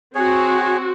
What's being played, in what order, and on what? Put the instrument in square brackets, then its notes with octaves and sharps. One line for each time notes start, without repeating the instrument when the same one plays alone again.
[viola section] C4 F#4 [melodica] G#4 C#5